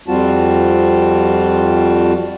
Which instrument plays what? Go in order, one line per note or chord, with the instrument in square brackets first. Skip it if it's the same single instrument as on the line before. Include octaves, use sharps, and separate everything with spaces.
[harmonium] F2 G3 C4 F4 F#4 A5